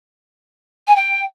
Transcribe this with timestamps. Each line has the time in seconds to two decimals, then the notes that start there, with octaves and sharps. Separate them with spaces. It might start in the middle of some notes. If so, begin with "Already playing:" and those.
0.87 G#5
0.96 G5